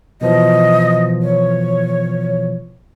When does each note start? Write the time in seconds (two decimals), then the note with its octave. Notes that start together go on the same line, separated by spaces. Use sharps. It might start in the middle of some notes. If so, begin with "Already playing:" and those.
0.21 B2 E3 F3 D#5
1.22 C#5